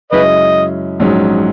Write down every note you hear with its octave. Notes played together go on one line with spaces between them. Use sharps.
F#2 C#3 G#3 C#4 E4 B4 D#5
A#1 G#2 F#3 C#4